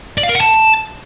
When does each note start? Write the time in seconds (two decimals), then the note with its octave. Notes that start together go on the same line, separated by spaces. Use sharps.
0.18 D5
0.23 F5
0.29 A#4
0.35 F#5
0.41 A5